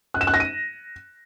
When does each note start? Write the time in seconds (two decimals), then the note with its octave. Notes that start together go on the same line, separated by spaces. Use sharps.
0.14 F#6
0.21 E7
0.27 F#6
0.34 A#6
0.40 D#7